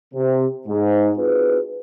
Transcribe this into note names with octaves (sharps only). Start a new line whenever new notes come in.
C3
G#2
C4 D#4 F4 F#4 G#4 B4